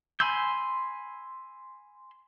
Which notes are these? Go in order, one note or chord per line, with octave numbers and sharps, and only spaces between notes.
G#5 B5 C6 E6 G6